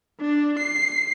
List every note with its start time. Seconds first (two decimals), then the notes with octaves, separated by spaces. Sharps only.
0.21 D4
0.59 C7